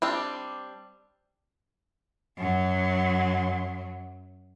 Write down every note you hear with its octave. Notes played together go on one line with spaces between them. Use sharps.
G3 C4 D4
F#2 F#3